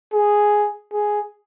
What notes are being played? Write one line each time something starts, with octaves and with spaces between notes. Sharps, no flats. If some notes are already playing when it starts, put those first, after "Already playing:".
G#4
G#4